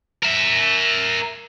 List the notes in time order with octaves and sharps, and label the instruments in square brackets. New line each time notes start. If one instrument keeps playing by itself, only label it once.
[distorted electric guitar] A#4 E5